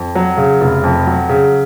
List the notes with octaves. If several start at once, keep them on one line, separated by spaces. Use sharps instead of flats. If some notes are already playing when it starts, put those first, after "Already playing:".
Already playing: F2
F#3
C#3
F1
F2
F#3
C#3